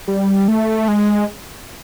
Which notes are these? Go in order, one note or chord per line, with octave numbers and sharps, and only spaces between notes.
G3
A3
G#3